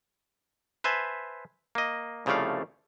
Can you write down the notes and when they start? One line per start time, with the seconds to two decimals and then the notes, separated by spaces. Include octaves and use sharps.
0.84 B4 C5 E5 G#5 A5
1.75 A#3 D#5
2.26 C2 C#3 F3 A3 D5 F5